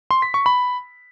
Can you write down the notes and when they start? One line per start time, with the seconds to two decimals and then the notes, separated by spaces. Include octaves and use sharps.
0.11 C6
0.22 B6
0.34 C#6
0.46 B5